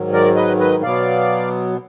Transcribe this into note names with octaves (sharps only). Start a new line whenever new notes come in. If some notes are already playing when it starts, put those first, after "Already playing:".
Already playing: G#2 D#3 F#3
A#4 D5
B4 D#5
B4 D#5
B2 F#3 B3 D5 F5